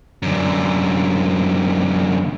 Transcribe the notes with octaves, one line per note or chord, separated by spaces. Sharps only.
F#2 D3